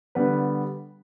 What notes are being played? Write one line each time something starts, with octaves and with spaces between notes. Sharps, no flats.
D3 G3 B3 B4